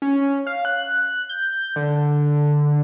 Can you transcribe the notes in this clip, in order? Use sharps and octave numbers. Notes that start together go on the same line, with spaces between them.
C#4
F5
F#6
G6
D3